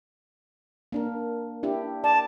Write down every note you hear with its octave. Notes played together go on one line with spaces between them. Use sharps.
A#3 D4 A#4
D4 E4 G4
D5 A5